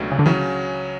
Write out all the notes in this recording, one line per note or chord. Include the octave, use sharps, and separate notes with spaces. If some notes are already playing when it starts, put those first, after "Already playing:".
Already playing: C#2 B2 F#3 A3 D4
C#3
D3
C#3 E3 F#3 C#4